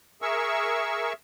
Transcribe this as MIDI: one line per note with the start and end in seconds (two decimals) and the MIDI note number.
0.22 1.13 68
0.22 1.13 70
0.22 1.13 76
0.22 1.13 85
0.22 1.13 88